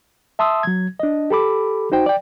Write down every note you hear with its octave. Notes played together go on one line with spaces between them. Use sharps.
E5 A5 C6 D#6 E6
F#3 G#6
D4 D#5
G4 A4 B5 D6
D#4 F#4 C5 G5
D5 G5